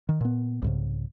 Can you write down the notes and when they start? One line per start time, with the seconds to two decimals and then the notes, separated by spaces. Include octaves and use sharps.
0.09 D#3
0.21 A#2 B3
0.62 C2 G#2 C#3